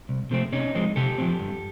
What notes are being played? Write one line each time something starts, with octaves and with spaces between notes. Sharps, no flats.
C2
C3 F3 A3 C4
C3 C#4 D#4
F3 G#3 C4
C3 G4 A4
F3 G#3 C4
G2